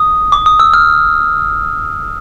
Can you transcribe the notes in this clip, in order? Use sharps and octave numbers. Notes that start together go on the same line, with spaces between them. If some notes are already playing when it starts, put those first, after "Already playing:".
Already playing: D#6
D6
D#6
E6
F6